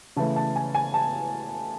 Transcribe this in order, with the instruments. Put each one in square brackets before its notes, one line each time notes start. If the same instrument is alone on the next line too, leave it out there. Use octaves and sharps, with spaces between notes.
[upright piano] C#3 E3 A3 A5
A5
G#5
G#5
A5